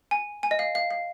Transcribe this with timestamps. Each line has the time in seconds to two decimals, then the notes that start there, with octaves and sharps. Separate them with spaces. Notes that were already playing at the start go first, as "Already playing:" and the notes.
0.11 G#5
0.43 G#5
0.51 D#5
0.59 F5
0.75 F5
0.91 F5